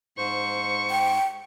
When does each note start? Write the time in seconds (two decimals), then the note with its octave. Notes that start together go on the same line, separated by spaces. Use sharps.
0.18 G#2 C5 C#6
0.90 G5